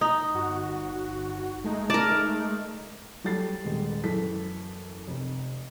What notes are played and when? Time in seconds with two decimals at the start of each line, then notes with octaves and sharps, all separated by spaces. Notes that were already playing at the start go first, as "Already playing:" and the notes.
0.01 D#4
0.35 G1 F#4
1.64 G#3 A3 D#4
1.90 A#4 D5 A5
3.24 F#3 G3 A4 A6 C7
3.64 D#1 G#3
4.04 F#2 E3 A4 B6
5.08 F1